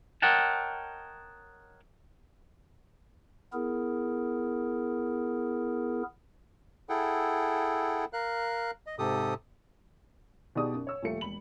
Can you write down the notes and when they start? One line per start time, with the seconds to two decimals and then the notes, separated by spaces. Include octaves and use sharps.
0.22 A#4 C#5 D#5 F#5 G5 A5
3.53 B3 E4 G#4 A#4
6.89 E4 G#4 A4 F#5 G5
8.13 A#4 F5 F#6
8.87 D#5
8.99 G#2 C3 G4 A4 D#6
10.55 B2 D#4 G4 G#4 D5 D#6
10.74 F#2
10.87 C#5 E6
11.02 D#1 F3 A3 C#7
11.21 E1 B5 F#7